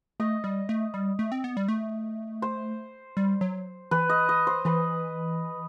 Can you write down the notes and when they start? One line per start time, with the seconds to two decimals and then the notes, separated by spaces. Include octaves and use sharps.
0.20 A3 D#5
0.44 G3
0.69 A3
0.94 G3
1.19 A3
1.32 C4
1.44 B3
1.57 G3
1.69 A3
2.42 C5
3.17 G3
3.41 F#3
3.91 E3 B4
4.10 D#5
4.29 D#5
4.47 C5
4.65 E3 B4